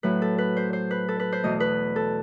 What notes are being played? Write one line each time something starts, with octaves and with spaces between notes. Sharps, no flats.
A2 F#3 A3 B4
A4
B4
C5
C5
B4
A4
B4
C5
E2 B2 A3 D#5
B4
A4